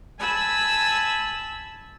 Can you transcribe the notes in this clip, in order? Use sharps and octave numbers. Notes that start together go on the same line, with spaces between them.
G#5 A5 B5 E6